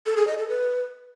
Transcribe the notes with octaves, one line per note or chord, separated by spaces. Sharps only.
A4
G#4
D#5
A4
B4